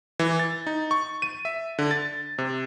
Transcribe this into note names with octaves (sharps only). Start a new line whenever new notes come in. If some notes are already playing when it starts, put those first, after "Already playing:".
E3
A6
D#4
C#6
D#7
E5
D3
A6
C3